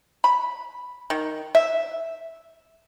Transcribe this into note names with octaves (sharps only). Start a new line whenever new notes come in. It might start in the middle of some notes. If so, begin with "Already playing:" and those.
B5
D#3
E5